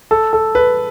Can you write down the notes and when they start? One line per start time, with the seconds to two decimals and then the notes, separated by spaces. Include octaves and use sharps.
0.11 A4
0.33 A4
0.55 B4